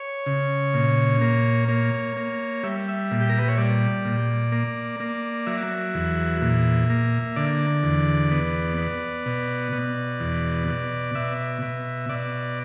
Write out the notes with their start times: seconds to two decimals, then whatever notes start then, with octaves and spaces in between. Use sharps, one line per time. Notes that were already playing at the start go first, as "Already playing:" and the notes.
Already playing: C#5
0.26 C#3
0.74 A#2
1.21 A#3
1.68 A#3 C#5
2.17 A#3
2.63 G3 E5
2.88 E5
3.11 A#2
3.21 G4
3.29 A#4
3.38 B4
3.48 C#5
3.58 G3 D5
4.05 A#2
4.52 A#3
5.00 A#3
5.47 F#3 E5
5.94 E2
6.41 A#2
6.90 A#3
7.36 D3 D5
7.83 E2
8.31 B3
8.78 B3
9.26 B2
9.72 B2
10.20 E2
10.68 B2
11.15 B2 E5
11.62 B2
12.09 B2 D5